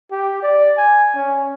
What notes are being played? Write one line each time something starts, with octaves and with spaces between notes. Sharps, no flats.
G4
D5
G#5
C#4